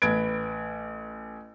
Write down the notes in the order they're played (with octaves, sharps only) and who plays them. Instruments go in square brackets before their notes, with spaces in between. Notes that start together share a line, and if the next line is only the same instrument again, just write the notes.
[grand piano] A1 B4 G#6 D7